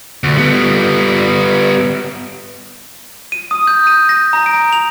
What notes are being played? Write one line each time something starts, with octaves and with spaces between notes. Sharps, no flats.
D2
G3 B3
D#7
D#6
G6
D#7
A#6
A#5
D7
F7